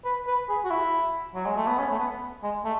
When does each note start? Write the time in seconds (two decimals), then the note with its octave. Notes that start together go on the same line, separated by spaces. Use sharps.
0.05 B4
0.27 B4
0.49 G#4
0.64 F#4
0.70 E4
1.35 F#3
1.46 G#3
1.56 A3
1.67 B3
1.78 C#4
1.91 A3
1.99 B3
2.43 G#3
2.64 A3